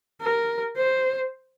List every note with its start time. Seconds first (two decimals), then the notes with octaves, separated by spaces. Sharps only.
0.22 A#4
0.77 C5